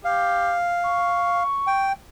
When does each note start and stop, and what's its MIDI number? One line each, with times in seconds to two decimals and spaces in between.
0.05 0.55 67
0.05 1.43 77
0.84 1.90 85
1.67 1.93 79